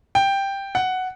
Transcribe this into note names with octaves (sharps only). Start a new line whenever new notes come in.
G5
F#5